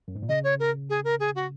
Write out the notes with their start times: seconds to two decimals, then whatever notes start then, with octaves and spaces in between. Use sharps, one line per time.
0.08 F#2
0.15 G#2
0.22 A#2
0.29 C#3 D#5
0.44 C#5
0.60 A#4
0.90 G#4
1.04 A#4
1.20 G#4
1.35 F#4